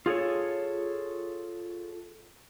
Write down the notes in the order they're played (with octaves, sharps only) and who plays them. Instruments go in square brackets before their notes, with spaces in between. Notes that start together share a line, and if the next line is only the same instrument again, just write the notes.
[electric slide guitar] F4 G#4 A4 C#5